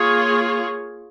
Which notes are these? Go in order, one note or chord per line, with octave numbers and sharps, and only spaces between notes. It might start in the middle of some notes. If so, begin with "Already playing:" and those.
Already playing: A#3 F4 G#4 C#5